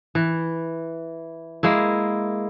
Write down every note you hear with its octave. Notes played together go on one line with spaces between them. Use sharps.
E3
G#3 A#3 E4